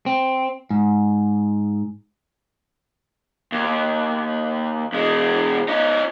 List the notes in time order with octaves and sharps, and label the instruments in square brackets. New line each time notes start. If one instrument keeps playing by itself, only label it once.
[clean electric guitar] C4
G#2
[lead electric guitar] D#2
E2 G#3
C#4 D#4